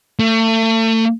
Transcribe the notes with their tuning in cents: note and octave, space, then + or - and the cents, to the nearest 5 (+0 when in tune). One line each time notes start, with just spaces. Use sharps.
A3 +35